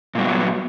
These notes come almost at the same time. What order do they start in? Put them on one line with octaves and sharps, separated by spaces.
A#2 G3 B3 F#3